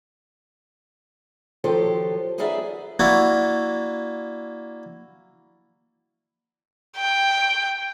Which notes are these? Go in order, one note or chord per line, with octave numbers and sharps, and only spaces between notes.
D#3 F3 F#3 G4 A4 C5
B3 D#4 F4 G#4 D5 E5
A#3 D4 E4 F#4
G5